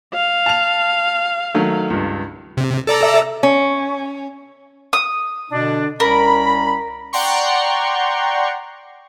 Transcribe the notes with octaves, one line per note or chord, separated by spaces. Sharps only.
F5
A5 F7
D#3 F#3 A3
C#2 G2
C3
A4 D5 A#5
E5
C#4
D#6
B2 D3 D4
C2 C#4 A#4 B5
D5 F#5 G5 A#5 C6 C#6